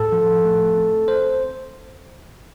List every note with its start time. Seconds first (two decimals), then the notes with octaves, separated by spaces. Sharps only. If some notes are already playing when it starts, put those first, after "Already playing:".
Already playing: A2 A4
0.12 F3
0.45 A3
0.77 C4
1.08 C5